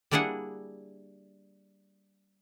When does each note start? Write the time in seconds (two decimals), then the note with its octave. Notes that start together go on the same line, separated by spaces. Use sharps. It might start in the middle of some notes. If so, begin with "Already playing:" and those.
0.11 G3 A#3 D4 E4 G#4 F#5